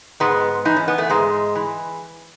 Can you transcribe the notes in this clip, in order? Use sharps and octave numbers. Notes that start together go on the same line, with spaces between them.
G#2 G#3 B3
E3 D#4
C#4
B3
A3
G#2 G#3
E3